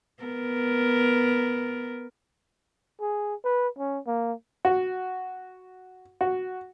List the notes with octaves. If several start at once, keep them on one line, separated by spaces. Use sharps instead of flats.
B3 A#4
G#4
B4
C#4
A#3
F#4
F#4